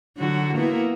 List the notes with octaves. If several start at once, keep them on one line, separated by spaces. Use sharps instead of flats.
D3 F#3 F#4
A#3 B3 E4